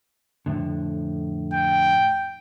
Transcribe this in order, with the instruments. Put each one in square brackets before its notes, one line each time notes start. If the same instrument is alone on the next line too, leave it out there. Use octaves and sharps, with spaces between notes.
[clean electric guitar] F2 A2 D3
[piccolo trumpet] G5